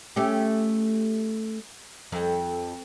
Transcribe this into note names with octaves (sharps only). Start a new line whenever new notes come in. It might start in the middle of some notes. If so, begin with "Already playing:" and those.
A3 C#4 G4
F2